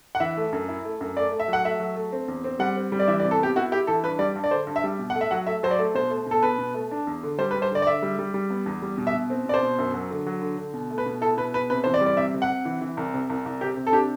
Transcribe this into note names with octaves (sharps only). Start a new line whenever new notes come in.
F#5
E3 E5
A3
F#2
E4
A3
F#2
A3 D5
A3
E5
F#3 F#5
A3 E5
F#3
A3
C4
E2
C4
G3 F#5
C4
G3
D5
E3 E5
D5
C3
A4
B3 G4
E4 F#4
E4 G4
E3 A4
G2 B4
G3 D5
G2
D5
D3 C5
G2
E5
G3
B2
A3 F#5
E5
F#3 F#5
A3 E5
F#3 C5
D5
A3
B2 C5
A3
B2 A4
B2 B4
B2
A3
D4
E2
D3
G3 C5
B4
G3
C5
D3 D5
D5
D3 E5
G3
G3
G3
B3
E2
G3
B2
E5
B2
C4
B2 D5
C5
B2
F#2
F#3
D3
F#3
D3
D3
B2
A3
B4
B2
E4 A4
B2 B4
B2 B4
C3 B4
E3 C5
D5
G3
D5
C3 E5
C3
F#5
C3
E3
E3
C2
C3
C2
C2
C3 G4
C3
A4
D4 G4